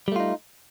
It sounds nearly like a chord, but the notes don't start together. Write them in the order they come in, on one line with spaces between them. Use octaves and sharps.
G3 A3 F4 D#4